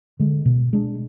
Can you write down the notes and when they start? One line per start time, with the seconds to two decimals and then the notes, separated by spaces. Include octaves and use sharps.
0.19 D3 G#3
0.46 B2
0.73 G#3 D4